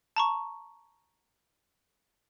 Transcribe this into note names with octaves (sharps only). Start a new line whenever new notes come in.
A5 A#5 C#6